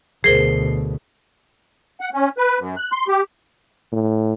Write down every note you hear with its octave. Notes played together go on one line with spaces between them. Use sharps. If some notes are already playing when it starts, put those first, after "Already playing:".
D2 B2 G#4 A#4 C5 C7 G7
F#5
C#4
B4
F#2
F#6
C6
G4
A2